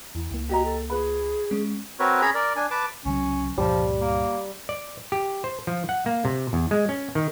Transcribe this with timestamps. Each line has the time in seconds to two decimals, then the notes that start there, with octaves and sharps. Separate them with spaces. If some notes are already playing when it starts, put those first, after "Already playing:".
0.15 E2 E4
0.31 C#2 A#3
0.49 F#4 G4 D#5 A#5
0.65 A4
0.90 F4 G#4 B4 B5
1.51 G#3 C#4
2.00 C4 F#4 A#4 B4 C#5
2.21 C#4 G#4 C#5 A#5 B5
2.34 A#4 D5
2.56 D4 G#5
2.71 B4 A5 D6
3.05 C2 C#3 F#3 C#4
3.58 C#2 G2 A#2 F3 G3
4.01 A#3
4.69 D5
5.12 G4
5.44 C5
5.67 F3
5.89 F#5
6.06 A#3
6.25 C3
6.53 E2
6.71 G#3
6.89 C#4
7.15 D#3